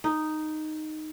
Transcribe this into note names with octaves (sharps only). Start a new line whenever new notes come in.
D#4